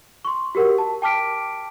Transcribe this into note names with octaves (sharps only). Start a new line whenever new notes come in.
C6 C#6
F#4 G4 A#4 F#5
A5
G5 A5 D6 F6 B6 D7